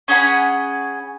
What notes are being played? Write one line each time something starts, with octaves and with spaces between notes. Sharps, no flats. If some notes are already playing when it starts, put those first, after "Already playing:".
C#4 G#4 F#5 B5